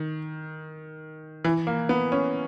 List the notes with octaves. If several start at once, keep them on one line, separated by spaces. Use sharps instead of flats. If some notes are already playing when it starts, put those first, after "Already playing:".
Already playing: D#3
E3
A#3
B3
C#4